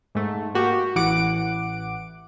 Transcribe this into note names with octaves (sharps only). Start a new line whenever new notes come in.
G#2 A3
A#3 F#4 G4
A1 E3 F#5 D6 D7